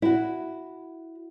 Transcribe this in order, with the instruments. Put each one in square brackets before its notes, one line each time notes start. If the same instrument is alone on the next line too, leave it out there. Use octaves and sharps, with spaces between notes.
[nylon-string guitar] E4 F#4